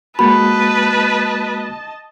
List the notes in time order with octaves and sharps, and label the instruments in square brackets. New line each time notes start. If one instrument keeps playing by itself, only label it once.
[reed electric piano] G#3 A#3 F#4 [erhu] B4 [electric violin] D#5 A5 [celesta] B5